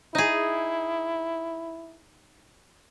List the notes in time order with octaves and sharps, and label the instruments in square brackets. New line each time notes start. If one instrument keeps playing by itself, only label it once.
[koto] D#4 G#4 [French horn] E4